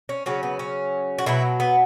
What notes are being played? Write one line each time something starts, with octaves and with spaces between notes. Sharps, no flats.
C#4
C#3 F#3 C#4
B3
C#4
F#4
B2 F#3 E4
B3